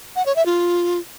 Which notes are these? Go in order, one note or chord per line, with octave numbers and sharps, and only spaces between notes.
F#5
C#5
E5
F4